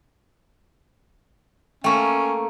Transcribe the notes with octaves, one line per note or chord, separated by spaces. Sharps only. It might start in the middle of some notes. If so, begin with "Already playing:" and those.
A3 A#3 C#4 G5 C#6